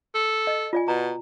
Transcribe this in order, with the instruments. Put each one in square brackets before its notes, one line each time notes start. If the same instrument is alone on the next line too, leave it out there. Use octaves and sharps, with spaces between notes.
[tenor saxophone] A4
[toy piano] D#5
F4 D5 G#5
[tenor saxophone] B2 [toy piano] A#5